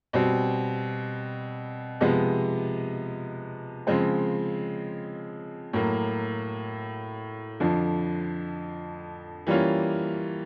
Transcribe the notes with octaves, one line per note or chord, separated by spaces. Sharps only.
B2 G3 C4
C3 F3 G#3 B3
C#3 F3 G#3 C4
A2 F#3 A#3
F2 D3 F3
E3 G3 A#3 C#4 F4